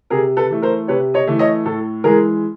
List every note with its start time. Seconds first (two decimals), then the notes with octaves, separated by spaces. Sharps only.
0.10 C3 G#4 A#4
0.37 A4 B4
0.50 E3 A3
0.62 A#4 C5
0.88 C3 B4 C#5
1.14 C#5 D#5
1.27 E3 A3
1.39 C#5 D#5
1.65 A2 A4
2.04 E3 G#3 G#4 A#4